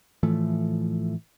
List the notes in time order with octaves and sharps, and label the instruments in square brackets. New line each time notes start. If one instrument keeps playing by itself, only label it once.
[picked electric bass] A2 E3 F3 A3